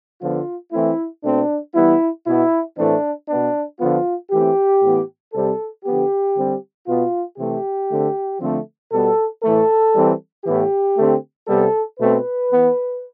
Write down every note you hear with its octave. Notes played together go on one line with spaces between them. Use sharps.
D3 F3 B3 F4
E3 A3 C4 E4
B2 A3 C4 D4
E3 G3 B3 E4
B2 B3 E4
A2 E3 A3 C4 D4
B2 B3 D4
D3 F3 B3 F4
E3 A3 C4 G4
A2 E3 B3
C3 G3 C4 A4
D3 F3 B3 G4
D3 G3 C4
B2 B3 F4
C3 E3 A3 C4 G4
D3 A3 C4
D3 F3 A3 C4
B2 G3 B3 A4
A2 E3 A3 A4
E3 G3 C4
A2 E3 B3 G4
D3 A3 C4
C3 G3 B3 A4
B2 A3 C4 B4
E3 B3